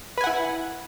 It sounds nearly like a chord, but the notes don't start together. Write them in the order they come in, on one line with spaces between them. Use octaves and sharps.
B4 G#5 F#5 E4